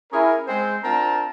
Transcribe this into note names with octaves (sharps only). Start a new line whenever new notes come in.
C#4 E4 G#4 A#4
G#3 C4 C5
C4 D4 F4 A#4 A5 A#5